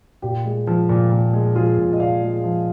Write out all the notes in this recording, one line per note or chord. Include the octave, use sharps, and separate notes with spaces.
A#2 G4
G#3
F3
A#2
A#2
G#3
F3 F4 G#4
A#2
D#5
A#2 D5 F5
G#3
F3